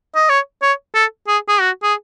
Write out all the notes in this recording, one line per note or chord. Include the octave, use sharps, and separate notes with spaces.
D#5
C#5
C#5
A4
G#4
G#4
F#4
G#4